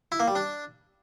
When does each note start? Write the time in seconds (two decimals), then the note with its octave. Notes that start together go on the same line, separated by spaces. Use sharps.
0.12 E4
0.20 A#3
0.28 G3
0.35 D4